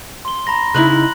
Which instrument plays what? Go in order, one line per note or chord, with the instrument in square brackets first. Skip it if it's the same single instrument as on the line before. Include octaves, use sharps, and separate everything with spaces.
[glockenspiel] C6 G7
A#5 B5 A#6
[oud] C#3 D#4 E4 [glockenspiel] F#6 F#7